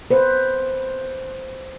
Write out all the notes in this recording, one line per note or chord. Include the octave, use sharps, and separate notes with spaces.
B4 C5